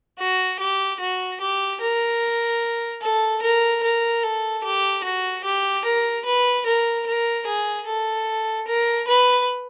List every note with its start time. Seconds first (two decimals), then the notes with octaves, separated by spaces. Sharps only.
0.19 F#4
0.59 G4
0.99 F#4
1.40 G4
1.80 A#4
3.02 A4
3.42 A#4
3.83 A#4
4.23 A4
4.63 G4
5.04 F#4
5.44 G4
5.84 A#4
6.25 B4
6.66 A#4
7.06 A#4
7.46 G#4
7.86 A4
8.67 A#4
9.07 B4